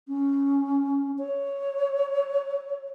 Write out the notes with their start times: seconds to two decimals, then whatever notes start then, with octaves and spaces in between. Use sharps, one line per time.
0.08 C#4
1.18 C#5